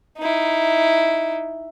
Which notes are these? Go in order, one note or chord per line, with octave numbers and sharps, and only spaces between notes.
D#4 E4